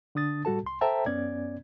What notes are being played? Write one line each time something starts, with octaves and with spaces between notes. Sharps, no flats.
D3 D4 D#6 A6
A2 G3 F#4 A4 A5
C2 C6
A4 C5 E5 G5 A5 A#5
F#2 B3 C#4 D5 G#6